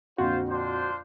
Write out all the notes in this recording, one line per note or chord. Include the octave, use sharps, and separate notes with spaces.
F2 A#2 D3 F4 F#4 C5
D4 F4 C5